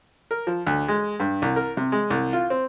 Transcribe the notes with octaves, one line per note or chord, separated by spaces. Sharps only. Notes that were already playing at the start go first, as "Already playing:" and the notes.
A#4
F3
D2
G#3
G2
C2
A#4
C3
G#3
C2
F4
C4